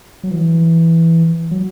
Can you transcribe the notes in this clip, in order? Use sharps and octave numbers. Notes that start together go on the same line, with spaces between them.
F#3
E3
F#3